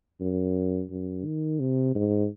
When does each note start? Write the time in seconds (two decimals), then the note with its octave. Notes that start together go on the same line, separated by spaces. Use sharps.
0.21 F#2
0.90 F#2
1.25 D#3
1.60 C3
1.95 G#2